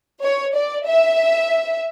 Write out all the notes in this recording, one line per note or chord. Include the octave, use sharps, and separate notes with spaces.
C#5
D5
E5